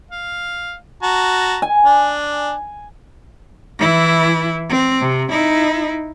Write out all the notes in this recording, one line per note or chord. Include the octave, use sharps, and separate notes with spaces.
F5
F#4 A5 A#5
G#5
D4
E3 E4
C4
C3
D#4 E4